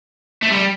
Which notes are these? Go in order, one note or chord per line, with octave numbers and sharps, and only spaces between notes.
A3
G3